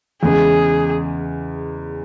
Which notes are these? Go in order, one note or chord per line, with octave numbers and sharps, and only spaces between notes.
E2 C#3 G#3 G#4